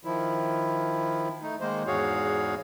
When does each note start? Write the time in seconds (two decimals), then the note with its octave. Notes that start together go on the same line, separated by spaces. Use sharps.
0.05 D#3 F3 E4
1.42 A3 D#4
1.60 D#3 G#3 A#3 C5
1.87 E2 G#2 F#4 G#4 C#5 F5